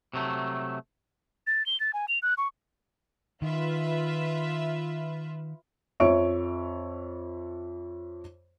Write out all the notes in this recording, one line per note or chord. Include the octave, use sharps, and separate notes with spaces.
C3 F#3 A3
A6
G7
A6
G#5
F7
F#6
C#6
D#3 F4 B4 E5
F2 C#5 E5 C#6 D7